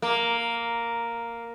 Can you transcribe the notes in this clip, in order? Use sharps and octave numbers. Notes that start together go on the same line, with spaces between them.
A#3